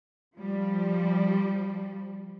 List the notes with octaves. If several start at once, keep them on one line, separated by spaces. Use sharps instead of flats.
F3 G3